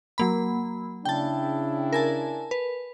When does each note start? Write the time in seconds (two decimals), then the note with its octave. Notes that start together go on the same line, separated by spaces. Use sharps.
0.18 F#3 A#3 B5
1.05 C#3 D4 E4 G5 A5
1.93 A#4 G#5 A5
2.51 B4